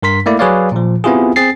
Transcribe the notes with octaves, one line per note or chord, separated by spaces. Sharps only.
G2 A#4 C6 B6
A3 A#3 E4 D5
F#3 G#4 B4 C#5 D5 F5
A#2 F3
B3 C4 E4 F4 G4 G#4
C4 G#4 A6 C7